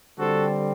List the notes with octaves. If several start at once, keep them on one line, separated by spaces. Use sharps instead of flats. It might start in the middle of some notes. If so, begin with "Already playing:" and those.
D3 G3 C4 F#4 A4